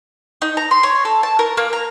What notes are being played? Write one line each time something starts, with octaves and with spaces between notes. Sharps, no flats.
D#4
A#5
C6
C#5
A4
A5
A#4
A#3
A#5